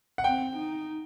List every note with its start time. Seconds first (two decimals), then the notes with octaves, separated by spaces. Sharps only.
0.18 F#5
0.24 C4 G5
0.56 D#4